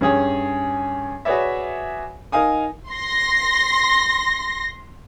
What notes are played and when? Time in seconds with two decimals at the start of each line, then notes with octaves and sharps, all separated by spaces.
0.01 G2 C#4 G#4 C#5
1.25 F#4 G#4 B4 C#5 D5 E5
2.32 D#4 A#4 F5 G#5 D#6
2.90 C6 A#6